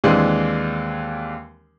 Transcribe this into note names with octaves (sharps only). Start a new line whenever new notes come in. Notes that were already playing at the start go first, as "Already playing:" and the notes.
D#2 E3 G#3 C4 D4